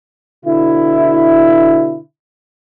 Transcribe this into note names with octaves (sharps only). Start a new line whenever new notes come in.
B2 D3 E4